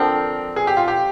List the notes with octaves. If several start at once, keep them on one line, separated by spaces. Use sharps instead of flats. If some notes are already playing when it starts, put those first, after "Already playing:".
Already playing: D3 F3 C4 A#4
G#4
G4
F4
G4